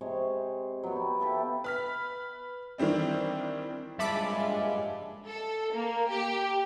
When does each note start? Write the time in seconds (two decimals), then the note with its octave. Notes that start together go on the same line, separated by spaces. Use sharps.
0.01 C3 G#3 C#5
0.83 F#3 B3
0.96 G4
1.20 E4 G4 A4 F5
1.64 B4 F6 B6
2.78 D#3 E3 G3 C4 D4
3.99 A#1 G2 C#3 G#3 E5 A5 B5 D6
5.26 A4
5.74 A#3
6.10 G4